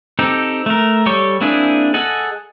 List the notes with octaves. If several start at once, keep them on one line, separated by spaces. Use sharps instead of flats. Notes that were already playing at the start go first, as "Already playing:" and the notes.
C4 D#4 G4 A4
A3 A#4
G3 G4 A4 C#5 C#6
A#3 C4 D4 E4 G#4
G#4 A4 D#5 F#5 A5